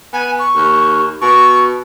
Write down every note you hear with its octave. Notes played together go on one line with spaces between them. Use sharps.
B3 G#5
C#6
D#2
B2 C#6